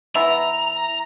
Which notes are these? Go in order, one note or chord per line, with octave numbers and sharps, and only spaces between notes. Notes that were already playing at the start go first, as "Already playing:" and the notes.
E3 B3 E5 A#5